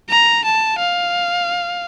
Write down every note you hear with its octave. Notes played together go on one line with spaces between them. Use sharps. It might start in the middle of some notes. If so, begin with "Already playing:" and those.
A#5
A5
F5